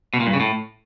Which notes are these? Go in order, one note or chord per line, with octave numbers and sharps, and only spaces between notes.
B2
A#2
G2
C#3
A2